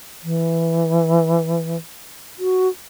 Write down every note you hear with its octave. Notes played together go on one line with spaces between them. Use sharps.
E3
F#4